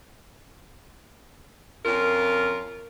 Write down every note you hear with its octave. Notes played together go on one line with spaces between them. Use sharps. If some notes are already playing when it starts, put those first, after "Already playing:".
F2 C#4 F4 A#4